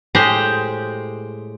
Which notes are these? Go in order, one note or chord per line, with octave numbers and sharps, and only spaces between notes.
A2 G#3 G4 C5 D#5